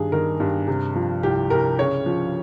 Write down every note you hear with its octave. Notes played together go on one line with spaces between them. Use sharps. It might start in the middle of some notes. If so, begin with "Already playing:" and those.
Already playing: G2 D#3 G#4
D#3 A#4
G2
C3
F3
C2 G4
C2 A#4
C#3 C#5
F3